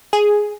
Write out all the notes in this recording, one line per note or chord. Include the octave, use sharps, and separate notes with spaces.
G#4